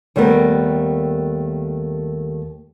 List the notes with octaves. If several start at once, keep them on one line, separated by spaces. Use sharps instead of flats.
D#2 G3 A3 B3 A#4